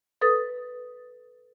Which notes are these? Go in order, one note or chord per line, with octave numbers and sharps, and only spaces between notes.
A4 B4 D#6 A6